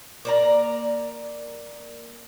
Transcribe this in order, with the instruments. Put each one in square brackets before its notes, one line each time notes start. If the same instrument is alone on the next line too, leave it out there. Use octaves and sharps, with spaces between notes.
[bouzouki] A#3 D5 A#5